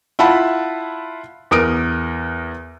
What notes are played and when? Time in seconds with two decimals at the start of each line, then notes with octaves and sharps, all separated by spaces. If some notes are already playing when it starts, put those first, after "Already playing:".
0.19 E4 F4 F#5 A5 B5
1.51 E2 A#4 D#6 D7